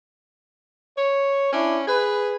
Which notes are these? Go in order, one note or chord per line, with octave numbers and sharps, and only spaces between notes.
C#5
C#4 D4 E4
G#4 B4